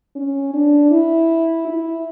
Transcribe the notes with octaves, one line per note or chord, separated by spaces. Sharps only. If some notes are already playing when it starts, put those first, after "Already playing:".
C#4
D4
E4
E4